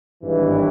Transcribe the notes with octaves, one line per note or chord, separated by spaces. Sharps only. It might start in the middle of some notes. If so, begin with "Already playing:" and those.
G#1 G2 E3